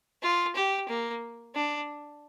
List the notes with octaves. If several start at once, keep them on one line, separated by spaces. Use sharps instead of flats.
F4
G4
A#3
D4